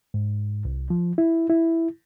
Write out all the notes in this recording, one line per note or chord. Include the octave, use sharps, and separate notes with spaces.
G#2
C2
F3
E4
E4